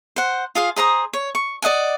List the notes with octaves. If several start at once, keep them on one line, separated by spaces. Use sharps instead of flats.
C5 F#5
F4 G#4 F5
G#4 C5 A#5 D#6
C#5
C#6
D5 D#5 F#5 G#5